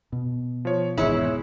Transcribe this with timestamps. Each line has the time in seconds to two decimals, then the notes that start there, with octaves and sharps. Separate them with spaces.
0.13 B2
0.65 F3 C#5
0.98 G#1 E2 G#3 E4 C#5